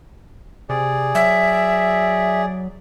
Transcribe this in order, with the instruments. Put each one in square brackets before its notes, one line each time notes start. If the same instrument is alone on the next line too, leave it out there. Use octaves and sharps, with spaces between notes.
[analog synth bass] C3 [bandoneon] G#4 D5
[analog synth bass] F#3 [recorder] E5